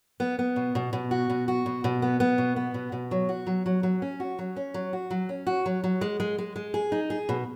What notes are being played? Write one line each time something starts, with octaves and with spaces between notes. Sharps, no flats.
B3
B3
B2
B2
B2
F#4
B2
F#4
B2
B2
B3
B3
B2
B3
B2
B2
F#3
F#4
F#3
F#3
F#3
C#4
F#4
F#3
C#4
F#3
F#4
F#3
C#4
F#4
F#3
F#3
G#3
G#3
G#3
G#3
G#4
D#4
G#4
B2